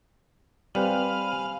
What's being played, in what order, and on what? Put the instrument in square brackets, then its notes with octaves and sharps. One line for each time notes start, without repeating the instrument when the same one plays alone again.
[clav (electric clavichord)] G3 [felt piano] C4 B4 C5 [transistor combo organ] F5 [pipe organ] G#5 B5